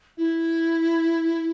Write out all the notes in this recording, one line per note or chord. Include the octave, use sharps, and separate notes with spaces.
E4